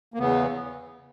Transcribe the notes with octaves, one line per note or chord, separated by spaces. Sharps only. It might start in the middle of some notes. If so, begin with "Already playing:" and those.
A#3
E2 C#3 E3 B3